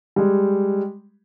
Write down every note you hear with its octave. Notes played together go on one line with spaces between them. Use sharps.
G3 G#3